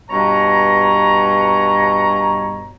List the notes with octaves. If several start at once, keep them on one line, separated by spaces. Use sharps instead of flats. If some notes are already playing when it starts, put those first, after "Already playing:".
G2 B2 C#5 A#5